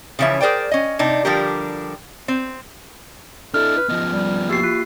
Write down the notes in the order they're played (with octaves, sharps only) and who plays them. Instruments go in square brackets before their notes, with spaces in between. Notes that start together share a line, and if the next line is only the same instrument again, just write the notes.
[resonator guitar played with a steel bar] C#3 E3 F3 C#4 E5
G#4 A#4 C5 D5 G5
C#4 D#5
C3 D4 D#4
D3 F3 G3 D4 G4 A#4
C4
[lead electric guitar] D4 E4 [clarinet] A4 [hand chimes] F6
[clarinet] B4
[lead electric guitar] F3 B3 [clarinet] D#5
[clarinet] G3
[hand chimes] A#3 G4 C7 [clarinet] F#4
[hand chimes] F4